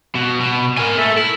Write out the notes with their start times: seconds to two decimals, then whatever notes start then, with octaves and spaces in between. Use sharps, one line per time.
0.15 B2
0.40 B2
0.78 A#4 G#5
0.98 A4 E5
1.18 E4